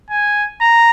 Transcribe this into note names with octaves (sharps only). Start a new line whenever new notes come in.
G#5
A#5